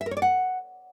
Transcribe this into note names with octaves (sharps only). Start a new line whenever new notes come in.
E5
A#4
C#5
D5
F#5